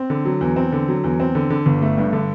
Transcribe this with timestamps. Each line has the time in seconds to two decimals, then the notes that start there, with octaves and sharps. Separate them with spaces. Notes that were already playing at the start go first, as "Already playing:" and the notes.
Already playing: C4
0.10 D3
0.25 F#3
0.41 E2
0.56 C4
0.72 D3
0.88 F#3
1.04 E2
1.20 C4
1.35 D3
1.50 D3
1.66 G1
1.82 A3
1.98 G2
2.13 D3